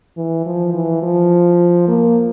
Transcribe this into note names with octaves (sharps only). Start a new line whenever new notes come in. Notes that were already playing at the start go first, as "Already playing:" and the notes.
E3
F3
E3
F3
A#3